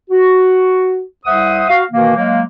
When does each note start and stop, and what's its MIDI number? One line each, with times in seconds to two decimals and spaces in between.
0.11 1.01 66
1.25 1.63 36
1.25 1.63 72
1.25 1.63 76
1.25 1.63 78
1.25 1.63 87
1.69 1.83 66
1.69 1.83 77
1.91 2.14 47
1.91 2.14 51
1.91 2.14 52
1.91 2.14 58
2.16 2.42 54
2.16 2.42 56
2.16 2.42 58